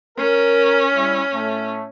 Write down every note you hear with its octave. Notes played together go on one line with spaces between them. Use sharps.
C#4 A#4
G3 E4
A2 A3